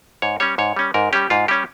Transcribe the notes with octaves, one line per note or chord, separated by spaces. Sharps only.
G#2 C#5
G3 C#4 C#5
G#2 C#5
G3 C#4
G#2 A#4
G3 C#4 G4
G#2 F4
G3 C#4 G4